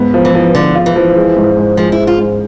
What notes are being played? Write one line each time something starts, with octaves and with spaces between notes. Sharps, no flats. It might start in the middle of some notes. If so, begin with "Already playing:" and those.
Already playing: G#2 B3
F3
E3
F3
D3 F3
F4
E3
F3
G#3
G#2
G#2
F3 G#3
E4
G#3
F4
G#2